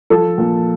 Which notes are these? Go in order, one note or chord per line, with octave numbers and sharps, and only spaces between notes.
F3 A4
A#2